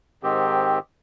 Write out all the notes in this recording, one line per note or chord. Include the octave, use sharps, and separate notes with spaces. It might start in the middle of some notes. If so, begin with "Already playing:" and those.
G#2 D#3 C4 G4